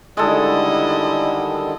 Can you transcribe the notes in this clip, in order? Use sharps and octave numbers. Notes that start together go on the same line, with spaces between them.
D3 D#3 G3 G#3 E4 A4 D#5